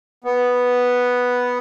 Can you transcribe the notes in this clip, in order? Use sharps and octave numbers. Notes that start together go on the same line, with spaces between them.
B3